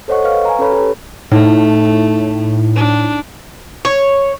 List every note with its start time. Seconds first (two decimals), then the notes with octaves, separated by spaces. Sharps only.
0.08 A4 C5 C#5 D#5 F#5 C#6
0.24 B4 F5 C#6 F6
0.45 G#5 A#5
0.59 C#4 A4 B4 C#5 B5
0.72 G4 A4
1.32 A2 A3 D#4
2.76 D4
3.85 C#5